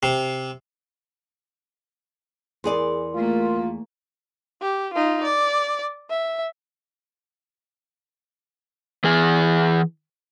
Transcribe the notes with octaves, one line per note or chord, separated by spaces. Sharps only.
C3
E2 G#4 A#4 D5 C6
A3 A#3 F4
G4
D#4 F4
D5
E5
E3 G#4 G#5